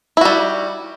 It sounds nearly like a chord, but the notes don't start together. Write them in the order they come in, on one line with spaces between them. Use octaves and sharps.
E4 F#4 G3